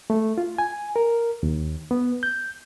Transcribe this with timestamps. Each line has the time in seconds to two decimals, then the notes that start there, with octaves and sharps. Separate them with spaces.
0.10 A3
0.38 F4
0.58 G#5
0.96 A#4
1.43 D#2
1.91 B3
2.23 G6